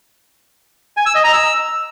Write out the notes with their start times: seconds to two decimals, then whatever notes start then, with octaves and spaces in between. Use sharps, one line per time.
0.97 G#5
1.06 E6
1.15 D#5
1.24 A#5
1.33 E6